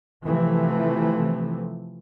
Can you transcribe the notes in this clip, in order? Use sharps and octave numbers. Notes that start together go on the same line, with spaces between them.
C3 E3 F3 A3